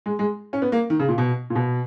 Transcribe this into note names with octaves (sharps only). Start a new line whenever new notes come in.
G#3
G#3
C#4
B3
A#3
D#3
C#3
A#2
B2
A#2
B2